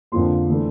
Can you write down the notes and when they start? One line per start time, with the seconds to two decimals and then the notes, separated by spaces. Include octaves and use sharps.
0.12 F2 D3 F3 A#3 C6
0.48 E3 A3 D4